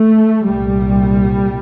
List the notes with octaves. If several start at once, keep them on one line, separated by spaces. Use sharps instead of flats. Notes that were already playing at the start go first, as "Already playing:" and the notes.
Already playing: A3
C2 A#2 G3